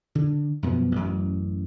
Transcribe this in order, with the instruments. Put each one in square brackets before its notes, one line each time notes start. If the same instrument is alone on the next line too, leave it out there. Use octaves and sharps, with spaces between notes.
[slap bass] D3
F#2 B2 F3 B3
A1 F#2